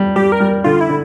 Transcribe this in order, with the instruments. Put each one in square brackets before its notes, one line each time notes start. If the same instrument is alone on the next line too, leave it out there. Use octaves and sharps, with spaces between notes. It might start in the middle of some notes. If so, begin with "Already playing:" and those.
Already playing: [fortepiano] G3
[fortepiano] G3 [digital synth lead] G4
[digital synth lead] A#4
[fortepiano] G3
[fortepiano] D3 [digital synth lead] F4
[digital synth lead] E4
[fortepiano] D3